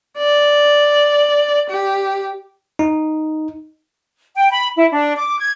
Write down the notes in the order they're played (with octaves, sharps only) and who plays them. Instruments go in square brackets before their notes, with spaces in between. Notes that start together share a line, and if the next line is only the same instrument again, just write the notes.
[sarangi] D5
G4
[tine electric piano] D#4
[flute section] G5
B5
E4
D4
D6
G#6